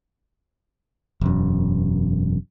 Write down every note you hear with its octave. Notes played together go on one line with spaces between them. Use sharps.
E1 F#2